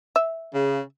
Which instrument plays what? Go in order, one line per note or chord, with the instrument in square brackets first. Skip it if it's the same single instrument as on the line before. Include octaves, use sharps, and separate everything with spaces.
[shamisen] E5
[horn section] C#3